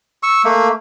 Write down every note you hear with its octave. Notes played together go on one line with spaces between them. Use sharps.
C#6 E6
A3 A#3